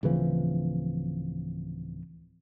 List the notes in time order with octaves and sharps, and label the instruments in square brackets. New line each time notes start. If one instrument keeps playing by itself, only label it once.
[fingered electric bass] D1 C#3 E3 F3